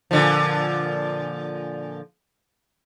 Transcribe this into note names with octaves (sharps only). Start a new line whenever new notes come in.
A#2 D3 F3